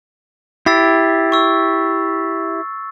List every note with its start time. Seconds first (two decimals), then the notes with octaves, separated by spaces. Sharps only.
0.66 E4 G4 E6 A6 C7
1.32 C#6 E6